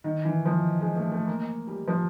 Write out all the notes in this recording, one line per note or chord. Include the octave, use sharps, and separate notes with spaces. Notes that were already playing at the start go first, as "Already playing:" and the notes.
D#3
E3
F3
G#3
A3
A3
A#3
G3
F3